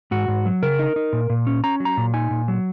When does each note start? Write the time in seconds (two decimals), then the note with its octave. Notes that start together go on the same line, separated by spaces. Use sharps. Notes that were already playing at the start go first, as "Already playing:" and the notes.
0.11 G#2 F#4
0.28 G#2
0.46 F#3
0.62 C#3 A#4
0.79 D#4
0.96 D#4
1.13 A#2
1.30 A#2
1.47 C#4
1.64 C#4 A#5
1.80 F#3
1.85 A#5
1.97 A#2
2.14 D#4 G#5
2.31 A#2
2.48 F#3